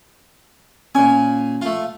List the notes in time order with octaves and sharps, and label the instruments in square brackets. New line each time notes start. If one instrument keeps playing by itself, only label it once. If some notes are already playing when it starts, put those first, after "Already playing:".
[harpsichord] A#2 G#5 [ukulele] C#4
[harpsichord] A3 F4